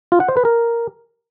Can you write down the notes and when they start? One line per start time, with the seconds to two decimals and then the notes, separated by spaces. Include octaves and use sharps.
0.12 F4
0.20 F#5
0.28 C5
0.37 B4
0.45 A#4